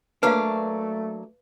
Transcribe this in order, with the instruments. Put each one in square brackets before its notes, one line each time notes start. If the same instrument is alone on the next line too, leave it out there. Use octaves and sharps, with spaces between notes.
[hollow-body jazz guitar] F#3 A#3 D4 [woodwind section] A3 [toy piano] B4 F5